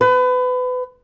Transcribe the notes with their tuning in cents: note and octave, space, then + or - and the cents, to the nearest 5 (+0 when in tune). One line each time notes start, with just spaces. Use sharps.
B4 +30